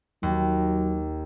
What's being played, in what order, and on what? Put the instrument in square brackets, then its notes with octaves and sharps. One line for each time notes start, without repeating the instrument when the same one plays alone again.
[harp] D#2 [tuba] F#3